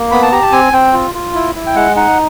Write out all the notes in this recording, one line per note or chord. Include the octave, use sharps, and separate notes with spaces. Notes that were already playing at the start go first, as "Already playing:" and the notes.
Already playing: A#3
B3 B5
A5
G4 A#5
A5
C4 G#5
C4 G5
F4
F4
E4
E4
G5
G#3 F#5
D#4 F#5